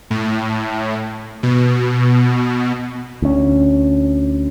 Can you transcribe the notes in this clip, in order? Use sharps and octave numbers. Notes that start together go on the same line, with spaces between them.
A2
B2
D2 C#4